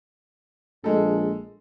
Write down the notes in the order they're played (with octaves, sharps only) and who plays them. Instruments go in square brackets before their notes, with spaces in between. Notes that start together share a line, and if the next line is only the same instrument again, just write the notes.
[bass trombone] A#1 [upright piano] G#3 A4